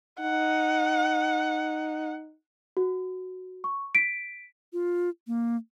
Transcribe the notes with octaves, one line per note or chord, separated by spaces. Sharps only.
D#4 F#5
F#4
C#6
B6 D7
F4
A#3